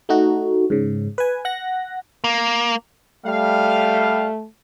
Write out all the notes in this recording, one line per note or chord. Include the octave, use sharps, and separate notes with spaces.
A3 D#4 F#4
G#2 C#3
B4 G#5
F#5 F#6 A#6
A#3
G3 A3 F5